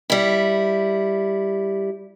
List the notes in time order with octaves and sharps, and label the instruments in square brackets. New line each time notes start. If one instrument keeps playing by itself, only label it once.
[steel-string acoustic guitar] G3 E4